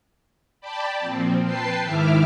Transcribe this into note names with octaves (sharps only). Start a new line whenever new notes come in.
D5 G5 A5 B5
A#2 F3 C4
B4 G5 A5 C7
G#2 D#3 E4 E5 D6 F6